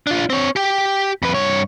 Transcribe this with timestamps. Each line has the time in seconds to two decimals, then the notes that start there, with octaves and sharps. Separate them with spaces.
0.07 D4 F4
0.30 C4 C#5
0.56 G4 G5
1.22 F2 B4
1.35 G2 C#5